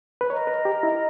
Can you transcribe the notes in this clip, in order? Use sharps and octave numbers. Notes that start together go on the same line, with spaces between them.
B4
A#4 C#5 D#5 A#5
B4
G4
E4